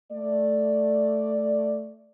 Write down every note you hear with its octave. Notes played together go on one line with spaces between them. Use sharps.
A3 D5